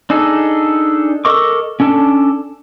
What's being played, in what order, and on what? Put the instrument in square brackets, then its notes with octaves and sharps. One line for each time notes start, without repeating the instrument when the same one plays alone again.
[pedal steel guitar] D4 D#4 G#4 A4
A4 A#4 D#5 C#6 D6
C#4 D4 A4 A5